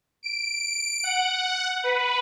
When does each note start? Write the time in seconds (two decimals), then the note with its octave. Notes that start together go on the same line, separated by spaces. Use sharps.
0.23 D7
1.04 F#5
1.84 B4